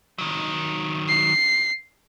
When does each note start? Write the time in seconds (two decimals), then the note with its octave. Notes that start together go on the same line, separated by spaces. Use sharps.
0.18 D#3 F#3
1.09 C7